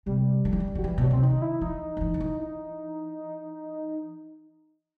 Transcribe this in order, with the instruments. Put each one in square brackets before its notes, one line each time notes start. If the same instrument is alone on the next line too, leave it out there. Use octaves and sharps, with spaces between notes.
[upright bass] C3 [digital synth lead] G3
[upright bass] D#3
E3
D#3
E3
[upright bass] D#3 [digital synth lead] F#3
[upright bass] E3 [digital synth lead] G3
[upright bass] B2
[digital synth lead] F#3
[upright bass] C3 [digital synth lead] C4
[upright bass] D#3 [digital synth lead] D#4
[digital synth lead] E4
[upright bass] E3 [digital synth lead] D#4
[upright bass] D#3
E3
D#3
E3
[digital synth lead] D#4